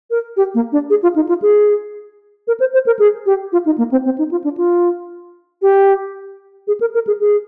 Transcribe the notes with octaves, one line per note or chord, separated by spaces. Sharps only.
A#4
G4
A#3
D4
G#4
F4
D#4
F4
G#4
A#4
C5
C5
A#4
G#4
G4
F4
D#4
A#3
C4
C4
D#4
F4
D4
F4
G4
G#4
A#4
A#4
G#4
G#4